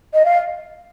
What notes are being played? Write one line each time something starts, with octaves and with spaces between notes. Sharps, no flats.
D#5
F5